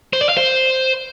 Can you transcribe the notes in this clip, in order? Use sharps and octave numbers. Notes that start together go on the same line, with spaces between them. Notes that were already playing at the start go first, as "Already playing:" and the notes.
C5
D5
F5
C5